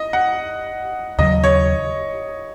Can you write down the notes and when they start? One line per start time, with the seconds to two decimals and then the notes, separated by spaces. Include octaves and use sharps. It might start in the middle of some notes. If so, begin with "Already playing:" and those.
Already playing: D#5
0.13 F#5
1.18 D#2 C#3 F#3 D#5
1.44 C#5